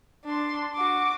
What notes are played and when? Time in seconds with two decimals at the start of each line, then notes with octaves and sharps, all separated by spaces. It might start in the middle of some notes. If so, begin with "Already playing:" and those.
0.25 D4 C6
0.75 F#4 D6